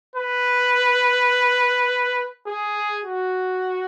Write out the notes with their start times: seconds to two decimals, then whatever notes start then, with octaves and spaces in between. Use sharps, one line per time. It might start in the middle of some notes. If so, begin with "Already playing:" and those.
0.15 B4
2.47 G#4
3.05 F#4